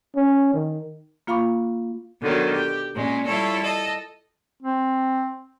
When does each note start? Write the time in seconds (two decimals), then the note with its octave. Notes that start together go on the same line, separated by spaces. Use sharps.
0.16 C#4
0.54 D#3
1.27 A#3 F4 F5 B5 C#6 D6
2.21 B2 D3 D#3 F#3
2.53 G4
2.94 A#2 G#3 C#4
3.25 G3 E4 F4 A4 C#5
3.60 A4 D#5
4.63 C4